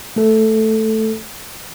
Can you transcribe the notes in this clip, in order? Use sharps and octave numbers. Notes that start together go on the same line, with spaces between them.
A3 A4